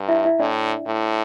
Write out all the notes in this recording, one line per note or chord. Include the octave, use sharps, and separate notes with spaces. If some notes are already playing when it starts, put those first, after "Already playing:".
Already playing: G2
E4 E5
E4 E5
A2 D4 D5
A2